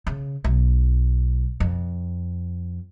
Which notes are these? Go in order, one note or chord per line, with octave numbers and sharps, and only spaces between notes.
C#3
B1
F2